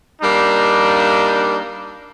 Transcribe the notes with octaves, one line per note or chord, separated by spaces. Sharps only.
G3 A#3 D4 D#4